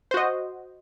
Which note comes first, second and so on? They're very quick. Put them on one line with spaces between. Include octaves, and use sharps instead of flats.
C5 F#4 D#5